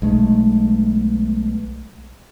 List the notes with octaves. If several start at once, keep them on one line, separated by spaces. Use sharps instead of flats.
B1 G#3 A3